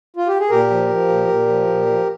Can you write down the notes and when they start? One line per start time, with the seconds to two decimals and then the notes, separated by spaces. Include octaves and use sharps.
0.16 F4
0.27 G4
0.39 G#4
0.49 A#2 G4 A#4
0.70 F3
0.89 F3
1.08 A#2
1.28 A#2
1.47 F3
1.67 A#2
1.86 F3